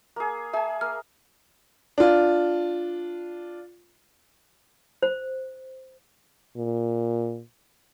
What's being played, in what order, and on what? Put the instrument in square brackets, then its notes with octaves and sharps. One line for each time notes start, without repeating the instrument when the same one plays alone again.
[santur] A#3 G#4
[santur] G#4 G#5 [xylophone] E5 A5
[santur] A#3 [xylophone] F6
[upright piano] D4 F4
[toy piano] C5
[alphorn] A#2